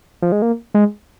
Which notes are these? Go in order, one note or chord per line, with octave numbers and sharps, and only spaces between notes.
F3
G#3
A#3
G#3